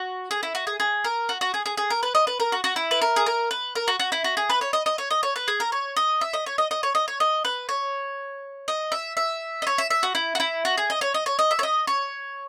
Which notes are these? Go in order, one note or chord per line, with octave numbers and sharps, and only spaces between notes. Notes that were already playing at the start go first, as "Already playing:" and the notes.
Already playing: F#4
G#4
E4
F#4
G#4
G#4
A#4
F#4
F#4
G#4
G#4
G#4
A#4
B4
D#5
B4
A#4
F#4
F#4
E4
B4
A#4
G#4
A#4
B4
A#4
F#4
F#4
E4
F#4
G#4
B4
C#5
D#5
D#5
C#5
D#5
C#5
B4
G#4
A#4
C#5
D#5
E5
D#5
C#5
D#5
D#5
C#5
D#5
C#5
D#5
B4
C#5
D#5
E5
E5
D#5
C#5
E5
E5
F#4
E4
F#4
E4
F#4
G#4
D#5
C#5
D#5
C#5
D#5
E5
C#5
D#5
C#5